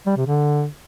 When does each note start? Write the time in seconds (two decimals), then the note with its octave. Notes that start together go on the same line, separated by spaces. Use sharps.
0.06 G3
0.16 C3
0.27 D3